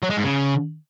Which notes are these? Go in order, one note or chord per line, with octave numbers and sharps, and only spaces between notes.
F#3
G#3
G#2
C#3